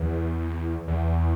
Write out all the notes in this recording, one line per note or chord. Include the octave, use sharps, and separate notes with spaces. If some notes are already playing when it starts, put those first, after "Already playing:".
Already playing: E2
E2